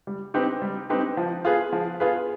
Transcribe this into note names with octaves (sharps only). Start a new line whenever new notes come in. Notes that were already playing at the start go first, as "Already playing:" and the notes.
G3
C4 D#4 G4 B4
G3
C4 D#4 G4 B4
F3
B3 F4 G#4 B4
F3
B3 F4 G#4 B4